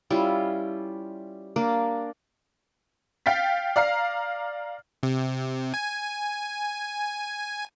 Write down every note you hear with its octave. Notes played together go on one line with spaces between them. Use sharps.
G3 C#4 E4 F4
A#3 D4
F5 G5 A6 B6
D5 F5 A#5 F6 C7
C3
G#5